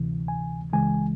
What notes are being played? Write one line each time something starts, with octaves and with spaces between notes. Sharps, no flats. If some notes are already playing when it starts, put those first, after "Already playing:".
Already playing: D2 C3 E3
G#5
C#2 C#3 E3 G#3 G#5